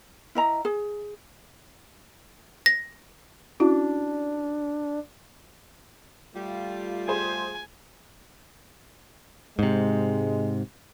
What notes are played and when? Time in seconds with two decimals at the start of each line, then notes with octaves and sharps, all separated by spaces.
0.35 E4 D#5 A#5
0.65 G#4
2.66 A#6
3.60 C#4 D4 E4 F#4
6.35 G3 A3 F4
7.08 G#4 C5 G#5
9.59 G#2 C3 G#3